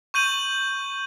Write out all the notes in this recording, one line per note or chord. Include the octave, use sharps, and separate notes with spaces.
C#6 G6 D#7 F#7